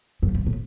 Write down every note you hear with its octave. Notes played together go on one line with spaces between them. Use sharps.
F#2
G2
A2